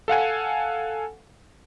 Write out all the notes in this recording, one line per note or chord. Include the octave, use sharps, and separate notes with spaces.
A4 F5 F#5 G#5